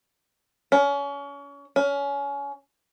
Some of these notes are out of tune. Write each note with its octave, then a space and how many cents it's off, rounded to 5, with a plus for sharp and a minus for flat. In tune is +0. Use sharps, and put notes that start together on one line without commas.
C#4 +30
C#4 +25